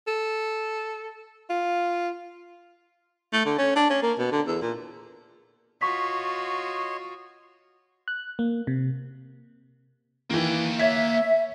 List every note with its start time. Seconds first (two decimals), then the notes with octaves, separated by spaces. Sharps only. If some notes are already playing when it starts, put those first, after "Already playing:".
0.07 A4
1.50 F4
3.33 A3
3.46 D3
3.58 C#4
3.76 D4
3.90 C#4
4.03 A#3
4.19 B2
4.32 D3
4.47 E2
4.62 A#2
5.81 F4 F#4 C#5 D#5 C6 C#6 B6
8.08 F#6
8.39 A#3
8.67 C3
10.31 D#3 E3 A#3 G5
10.79 C#5 E5 G#6 B6